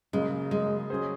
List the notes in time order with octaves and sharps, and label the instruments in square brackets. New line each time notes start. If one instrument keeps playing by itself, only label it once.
[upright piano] F#2 C#3 F#3 A#3 [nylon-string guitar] G#3
[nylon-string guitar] G#3
[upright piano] F#3 C#4 G#4 C5